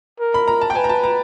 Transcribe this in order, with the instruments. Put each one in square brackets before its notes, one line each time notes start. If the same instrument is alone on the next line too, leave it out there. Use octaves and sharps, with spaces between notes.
[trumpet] A#4
[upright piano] B5
A#5
A5
G5
[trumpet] B4 [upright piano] G#5
[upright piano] A#5
A5
A#5